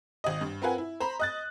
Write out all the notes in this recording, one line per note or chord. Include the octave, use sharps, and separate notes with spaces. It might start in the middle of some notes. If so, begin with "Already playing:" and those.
G#1 D#5
G2
C4 F4 A#4 B4 F#5 G#5
E4
C5 A#5 B5
D#5 F#6 A6